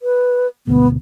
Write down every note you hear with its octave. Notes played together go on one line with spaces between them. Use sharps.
B4
G#1 D2 B2 B3